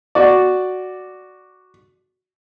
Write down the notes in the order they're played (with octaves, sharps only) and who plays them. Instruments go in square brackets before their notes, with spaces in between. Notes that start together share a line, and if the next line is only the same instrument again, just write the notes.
[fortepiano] F#4 D5